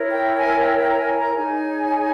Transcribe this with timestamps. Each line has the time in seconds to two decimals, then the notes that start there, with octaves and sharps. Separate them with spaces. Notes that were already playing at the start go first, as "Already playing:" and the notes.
Already playing: E4 A#4 C#5
0.12 G5
0.37 G#5
0.61 G5
0.79 G5
0.90 A#5
0.98 G#5
1.16 A#5
1.35 D#4 G#4 C#5 G#5